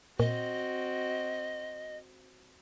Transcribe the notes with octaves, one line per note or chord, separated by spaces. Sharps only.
A#2 C4 F#4 D#5